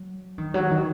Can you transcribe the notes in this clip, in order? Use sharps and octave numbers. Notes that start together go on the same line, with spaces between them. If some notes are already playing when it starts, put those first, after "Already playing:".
Already playing: F#3
D#3
F#3
D#3